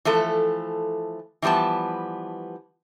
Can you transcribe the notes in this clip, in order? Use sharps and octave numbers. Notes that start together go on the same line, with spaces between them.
E3 F3 A3 A4
E3 F3 G3 B3 A5